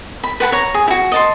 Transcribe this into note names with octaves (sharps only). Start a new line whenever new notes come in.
B5
B4 F#5 A5 B5
C#5 A#5
G#4
E4 F#4
D#5 A5 C6